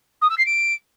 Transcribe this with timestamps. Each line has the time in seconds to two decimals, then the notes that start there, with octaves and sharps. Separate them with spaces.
0.22 D#6
0.30 E6
0.38 C7
0.46 D7